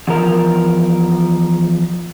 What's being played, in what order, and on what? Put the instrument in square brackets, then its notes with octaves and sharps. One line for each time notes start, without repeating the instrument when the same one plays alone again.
[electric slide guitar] E2 F3 A#4